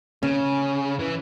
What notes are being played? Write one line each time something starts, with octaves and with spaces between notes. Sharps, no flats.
C#3 C#4
E3